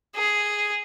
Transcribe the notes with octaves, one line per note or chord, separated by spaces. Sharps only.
G#4